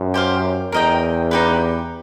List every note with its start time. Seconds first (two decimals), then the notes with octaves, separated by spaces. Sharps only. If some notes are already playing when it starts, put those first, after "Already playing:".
Already playing: F#2
0.14 G4 C5 F5
0.72 E2 A#4 D#5 G5
1.31 D#4 G4 B4